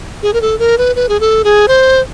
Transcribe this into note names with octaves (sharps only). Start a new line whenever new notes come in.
G#4
A#4
A4
A#4
B4
B4
G#4
A4
G#4
C5